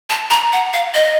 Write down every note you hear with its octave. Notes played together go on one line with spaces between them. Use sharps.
A5
A#5
F#5
F5
D#5